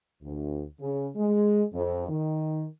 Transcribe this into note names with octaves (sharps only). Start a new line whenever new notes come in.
D2
C#3
G#3
F2
D#3